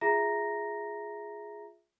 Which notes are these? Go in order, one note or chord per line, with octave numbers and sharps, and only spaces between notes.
F4 G#4 E5 A#5 A#6